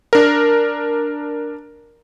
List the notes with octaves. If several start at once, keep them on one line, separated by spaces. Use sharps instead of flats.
D4 A#4